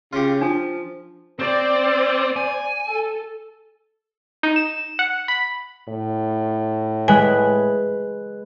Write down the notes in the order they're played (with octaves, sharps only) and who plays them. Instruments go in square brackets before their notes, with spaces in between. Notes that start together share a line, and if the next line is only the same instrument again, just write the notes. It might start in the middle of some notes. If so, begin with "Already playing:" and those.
[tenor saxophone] C#3 [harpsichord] F4 G4
[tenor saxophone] F3 [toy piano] D4
[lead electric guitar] C4 [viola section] C5 D5
[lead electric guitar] G#5
[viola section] A4
[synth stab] D#4
E7
F#5
B5
[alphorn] A2
[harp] G#3 B4 [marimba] G#5